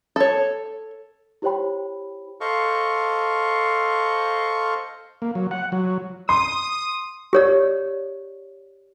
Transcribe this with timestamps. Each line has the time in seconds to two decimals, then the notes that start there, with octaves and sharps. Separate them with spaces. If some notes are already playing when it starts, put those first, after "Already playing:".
0.16 A4 C#5
1.42 E4 G4 C5 C#5 G5 B5
2.41 A4 C5 D#5 F5 C#6
5.22 A#3
5.35 F#3
5.51 F#5
5.72 F#3
6.29 C6 D#6
7.33 G4 C#5 D5